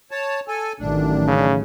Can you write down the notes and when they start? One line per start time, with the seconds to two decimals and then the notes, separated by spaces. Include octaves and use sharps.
0.11 C#5 A5
0.48 A4 G#5
0.80 A1 D#3 F#3 D4
1.27 C#3